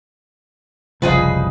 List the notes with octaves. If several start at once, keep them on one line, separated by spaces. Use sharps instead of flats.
F#1 C2 C#3 F3 C#4 D#4 G#4 B4